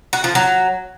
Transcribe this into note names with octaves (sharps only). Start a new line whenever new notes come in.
F#4
F3
F#3